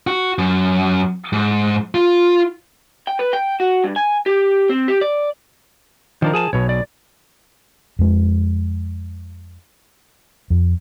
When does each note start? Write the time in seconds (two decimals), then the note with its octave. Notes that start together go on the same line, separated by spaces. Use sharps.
0.07 F#4
0.38 F#2
1.33 G#2
1.94 F4
3.07 G5
3.19 B4
3.33 G5
3.60 F#4
3.84 G2
3.96 G#5
4.26 G4
4.69 C4
4.88 G4
5.01 D5
6.22 D#3 F3 D4 A#4
6.33 G#4 G#5 A5
6.53 B1 B2 C#5
6.69 D5
7.99 F2 G#3
10.50 F2